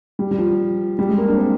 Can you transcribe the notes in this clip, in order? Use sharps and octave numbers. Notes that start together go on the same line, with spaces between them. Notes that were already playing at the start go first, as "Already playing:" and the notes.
G3
G3
F3
G3
G#3
A#3
D4
C4